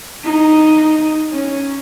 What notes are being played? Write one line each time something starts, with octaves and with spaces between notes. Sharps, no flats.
D#4
C#4